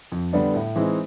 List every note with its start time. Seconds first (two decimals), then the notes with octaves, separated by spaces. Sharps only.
0.12 F2
0.33 D3 G3 B3 D4
0.54 A2
0.75 E3 G#3 C4 D#4